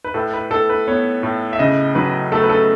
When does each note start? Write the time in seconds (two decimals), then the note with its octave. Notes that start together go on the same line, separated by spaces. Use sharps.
0.04 B4
0.14 A2 A4
0.33 B4
0.50 A2 A4
0.70 B4
0.88 B3 C#5
1.23 A2
1.53 E5
1.59 C#3 D#5
1.95 F#3 B4
2.32 A3 A4
2.43 B4
2.49 A4